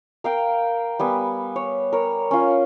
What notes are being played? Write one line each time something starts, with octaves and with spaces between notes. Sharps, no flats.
A#4 F5 G5
G3 B3 G#5
C#5
A#4 C#5
C#4 F4